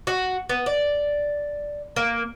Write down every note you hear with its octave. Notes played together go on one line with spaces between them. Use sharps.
F#4
B3
D5
A#3